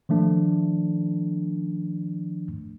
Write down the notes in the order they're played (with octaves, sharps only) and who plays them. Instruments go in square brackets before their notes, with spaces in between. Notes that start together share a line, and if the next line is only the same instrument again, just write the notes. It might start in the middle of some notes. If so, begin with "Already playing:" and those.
[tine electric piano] D#3 F3 A3 D4